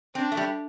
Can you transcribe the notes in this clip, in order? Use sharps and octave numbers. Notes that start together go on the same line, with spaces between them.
C4 D4
A3
G3